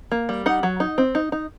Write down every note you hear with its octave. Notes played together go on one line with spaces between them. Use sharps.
A#3
G3
D#4 F#5
F#3
D#4
C4
D#4
D#4